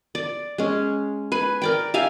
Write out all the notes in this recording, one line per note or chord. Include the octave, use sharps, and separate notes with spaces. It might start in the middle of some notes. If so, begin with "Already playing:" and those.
D5
G#3 C#4
B4 G#5
A#4 D5 G5
G4 E5 F5 G#5